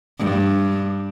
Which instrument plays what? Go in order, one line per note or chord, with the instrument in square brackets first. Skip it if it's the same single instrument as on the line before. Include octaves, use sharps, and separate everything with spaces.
[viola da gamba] G2